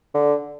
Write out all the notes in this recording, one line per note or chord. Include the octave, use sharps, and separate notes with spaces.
D3